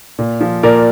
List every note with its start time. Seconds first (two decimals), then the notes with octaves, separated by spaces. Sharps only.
0.19 A#2
0.41 F3
0.63 A#2 A#4 D5